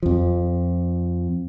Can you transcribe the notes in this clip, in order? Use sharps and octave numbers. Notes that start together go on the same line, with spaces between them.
F2 F3